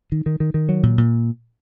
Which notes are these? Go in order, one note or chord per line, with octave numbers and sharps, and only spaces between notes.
D#3
D#3
D#3
D#3
F#3
A#2
A#2